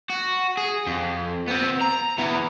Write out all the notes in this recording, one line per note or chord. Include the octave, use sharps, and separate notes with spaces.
F#4
G#4
F2
B3 C4
A#5
E3 B3